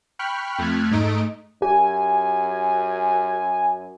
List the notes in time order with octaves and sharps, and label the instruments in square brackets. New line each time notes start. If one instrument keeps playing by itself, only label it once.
[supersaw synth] G5 B5 C#6 F6 F#6
F2 A3 F6 F#6 G#6 B6
G#2 A3 D#4 D#5 D7
[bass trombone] F#2 [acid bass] G4 [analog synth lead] G#5